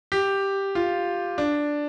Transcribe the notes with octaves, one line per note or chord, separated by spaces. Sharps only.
G4
F4
D4